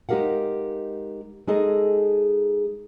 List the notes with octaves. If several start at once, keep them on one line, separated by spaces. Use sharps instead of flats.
G#3 D#4 G4 A#4 F5 F#5
G#3 D#4 G#4 A4 D#5